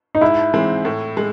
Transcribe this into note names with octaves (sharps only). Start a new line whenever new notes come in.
D#4
G#2 E4
E3 G#3 C4
A2
G#3